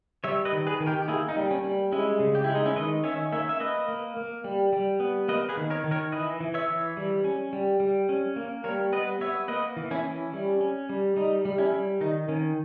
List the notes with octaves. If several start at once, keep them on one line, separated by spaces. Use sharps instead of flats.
G3 C#5 E5
B4 D#5
D#3
G#4 B4
D#3
G4 A#4
G4
A#3 E4 G#4
D#4
G3
C#4
G3
G#3 C#4 E4
C#3
G4
G#3 E4
D#4
C#4 E4
D#3 B4 D#5
C#4 C#5 E5
A#3 C#5 E5
E5
A#3 B4 D#5
A#3
A#3
G3
G3
B3
A#3 B4 D#5
G#4 B4
D#3
A#4 C#5
D#3
A#4 C#5
E3 B4 D#5
E3
C#5 E5
E3
G3
C#4
G3
G3
C#4
A#3
G3 A#4 C#5
B3 B4 D#5
B3 C#5 E5
A#3 B4 D#5
E3
C#4 E4
C#4
G3
C#4
G3
G3 D#4
G3
C#4 E4
G3
D#3 D#4
D#3 C#4